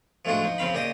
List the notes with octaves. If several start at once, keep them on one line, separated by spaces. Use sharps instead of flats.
F3 G#3 A3 D4 F4 F#4
F3 D#4
C#3 F3 C4 F5 B5
A#2 C#3 G4 D#5 D#6